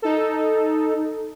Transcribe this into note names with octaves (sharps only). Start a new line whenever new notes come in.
D#4 A4